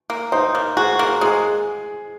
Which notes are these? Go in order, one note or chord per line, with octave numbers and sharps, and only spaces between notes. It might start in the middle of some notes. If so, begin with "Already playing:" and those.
A#3
D#4 C5
A#3
F#4 G#4
A#3
G#3 G#4